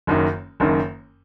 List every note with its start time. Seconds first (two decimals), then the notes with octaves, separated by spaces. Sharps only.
0.07 F#1 F#2 D#3
0.60 F#1 F#2 D#3